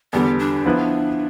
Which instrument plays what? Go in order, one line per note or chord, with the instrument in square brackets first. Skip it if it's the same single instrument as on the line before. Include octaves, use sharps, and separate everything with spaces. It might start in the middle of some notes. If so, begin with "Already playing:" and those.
[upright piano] E2 D3 G3 [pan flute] B3
[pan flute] D4
[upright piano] F3 B3 E4 B4